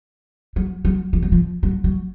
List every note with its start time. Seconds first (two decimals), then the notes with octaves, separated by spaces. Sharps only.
0.56 F#3
0.85 F#3
1.13 F3
1.22 F#3
1.32 F3
1.63 F#3
1.84 F#3